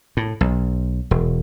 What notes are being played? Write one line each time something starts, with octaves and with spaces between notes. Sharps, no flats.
A2
B1
E1